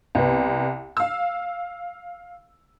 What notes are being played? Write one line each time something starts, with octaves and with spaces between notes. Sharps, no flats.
C2 B3
F5 E6